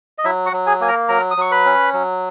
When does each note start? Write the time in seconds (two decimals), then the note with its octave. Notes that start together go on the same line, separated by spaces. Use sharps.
0.18 D#5
0.24 F#3 E4 E5
0.46 F#4 F#5
0.53 F#3
0.66 G#4 G#5
0.81 A#3 G#5
0.88 A#4 A#5
1.09 F#3 A#4 A#5
1.31 D#6
1.37 F#3 C#6
1.51 B4 B5
1.66 C#4
1.93 F#3